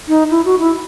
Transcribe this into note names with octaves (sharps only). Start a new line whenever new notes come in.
D#4
E4
F#4
E4